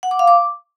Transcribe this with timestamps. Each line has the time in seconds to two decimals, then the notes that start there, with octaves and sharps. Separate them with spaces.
0.03 F#5
0.11 D6
0.19 F5
0.28 D6